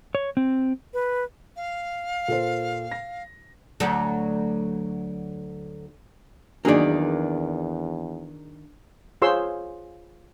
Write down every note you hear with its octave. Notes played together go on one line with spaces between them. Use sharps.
C#5
C4
B4
F5
A#2 A4 C5
A#6
D2 F#3 A4
E2 D#3 F#3 A#3 D4 G#4 D5
F4 G#4 C5 C#5 C6 E6